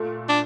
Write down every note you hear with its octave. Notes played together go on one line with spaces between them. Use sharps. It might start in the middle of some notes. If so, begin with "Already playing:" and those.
Already playing: A#2 A3
D4